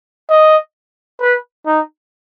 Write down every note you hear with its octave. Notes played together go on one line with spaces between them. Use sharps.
D#5
B4
D#4